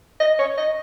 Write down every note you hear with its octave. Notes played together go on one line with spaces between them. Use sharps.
D#5
C#5
D#5